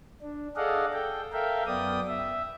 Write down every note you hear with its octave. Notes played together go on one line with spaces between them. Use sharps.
D4
G#4 A4 D5 D#5 F5 F#5
A4 G5
A4 A#4 E5 F5 G5
F#2 B3 D5 G5 D#6
E5